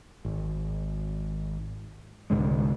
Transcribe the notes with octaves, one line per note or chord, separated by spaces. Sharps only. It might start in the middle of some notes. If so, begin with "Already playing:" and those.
G#1
C2 G#2 D3 G#3